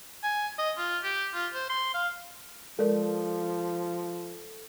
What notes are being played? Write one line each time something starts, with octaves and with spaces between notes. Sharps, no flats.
G#5
D#5
F4
G4
F4
C5
C6
F5
F3 G#3 A4 A#4 D5